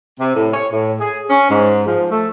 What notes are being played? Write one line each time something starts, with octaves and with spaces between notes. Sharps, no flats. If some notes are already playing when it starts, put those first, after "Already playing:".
C3
A2
C#5
A2
G#4
C#4
G#2
F3
A3